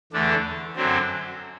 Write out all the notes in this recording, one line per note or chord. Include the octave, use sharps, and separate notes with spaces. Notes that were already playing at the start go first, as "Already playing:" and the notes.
E2 D3 A3 D4
F#2 D3 F#3 C4